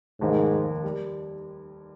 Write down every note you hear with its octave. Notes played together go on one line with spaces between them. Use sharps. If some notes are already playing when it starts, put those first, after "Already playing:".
F1 D#2 G#2 D#3 A#3
G3